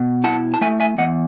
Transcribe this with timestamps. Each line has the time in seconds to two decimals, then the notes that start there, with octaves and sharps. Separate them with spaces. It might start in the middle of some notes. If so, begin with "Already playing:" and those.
Already playing: B2
0.24 E4 F#5 A5
0.54 A5
0.61 A3 E5 G#5
0.80 E5 G#5
0.98 E2 D#5 F#5